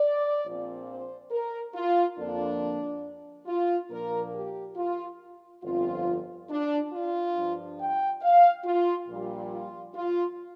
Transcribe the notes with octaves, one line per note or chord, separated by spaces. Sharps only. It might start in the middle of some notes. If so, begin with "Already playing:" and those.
Already playing: D5
A#1 A#2 F3 C4
C5
A#4
F4
F2 D3 A#3 D4
F4
A#2 F3 A#3 D4 A#4
G4
F4
G1 F2 F3 C4 F4
D4
F4
G2 F3 D4
G5
F5
F4
A#1 A#2 G3
F4
F4